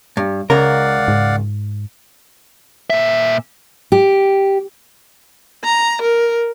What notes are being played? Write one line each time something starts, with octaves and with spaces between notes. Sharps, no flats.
G2
C#2 C#3 A#4 D5 F5 F#5
G#2
A#2 E5
G4
A#5
A#4